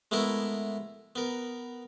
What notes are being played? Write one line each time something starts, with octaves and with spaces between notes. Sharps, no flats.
G#3 A3 B3 E4 A#4
B3 A#4